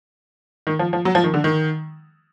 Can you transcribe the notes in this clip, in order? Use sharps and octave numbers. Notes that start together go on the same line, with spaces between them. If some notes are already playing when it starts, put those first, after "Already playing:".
D#3
F3
F3
F#3
F3
D#3
D3
D#3